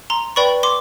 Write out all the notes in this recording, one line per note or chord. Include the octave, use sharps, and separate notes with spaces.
A#5 C6
B4 D5 G5 B5 C#6
C6 D6